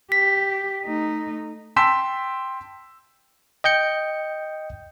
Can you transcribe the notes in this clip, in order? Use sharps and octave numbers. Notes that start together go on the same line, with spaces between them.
G4 B6
A3 D#4
G5 A5 C6 E6 B6 E7
D#5 G5 G6 C#7